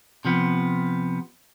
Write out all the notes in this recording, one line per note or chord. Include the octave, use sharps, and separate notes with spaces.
C3 F3 B3